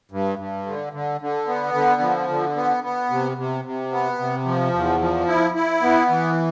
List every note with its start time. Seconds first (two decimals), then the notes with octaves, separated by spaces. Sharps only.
0.11 G2
0.39 G2
0.66 D3
0.93 D3
1.21 D3
1.47 B3
1.74 D3
2.01 F3
2.29 D3
2.56 B3
2.84 B3
3.10 C3
3.37 C3
3.65 C3
3.92 B3
4.19 C3
4.46 F3
4.73 E2
5.00 F3
5.28 E4
5.55 E4
5.82 B3
6.10 E3